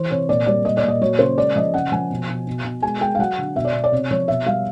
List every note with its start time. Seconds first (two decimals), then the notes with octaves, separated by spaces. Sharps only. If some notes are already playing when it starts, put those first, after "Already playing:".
Already playing: E3 C5
0.10 C3 C#5
0.29 A#2 D5
0.46 G3 D5
0.64 A#2 D#5
0.77 D5
0.83 A#2 D#5
1.01 F#3 C#5
1.19 C#3 C5
1.37 G#3 D5
1.56 F3 D#5
1.74 C#3 F#5
1.92 F3 G#5
2.10 B2
2.28 B2
2.47 B2
2.64 B2
2.82 G#3 G#5
3.01 G#3 G5
3.15 F5
3.19 F#3 F#5
3.38 D3
3.56 B2 E5
3.65 D5
3.74 B2
3.84 D5
3.92 C3 C#5
4.11 F3 C#5
4.28 B2 E5
4.46 G3 F5